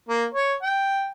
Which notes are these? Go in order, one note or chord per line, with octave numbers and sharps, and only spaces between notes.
A#3
C#5
G5